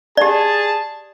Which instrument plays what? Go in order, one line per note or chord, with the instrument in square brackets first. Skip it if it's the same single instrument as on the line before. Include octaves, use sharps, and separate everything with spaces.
[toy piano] G4 D5 [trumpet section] G#4 A5